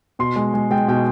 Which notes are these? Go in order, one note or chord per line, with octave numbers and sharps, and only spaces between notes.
B2 C6
G#3
G#3
G#3 G5
B2 G5